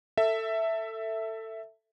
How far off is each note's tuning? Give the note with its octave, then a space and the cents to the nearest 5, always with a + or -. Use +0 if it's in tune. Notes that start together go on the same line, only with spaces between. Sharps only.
A4 +20 E5 +0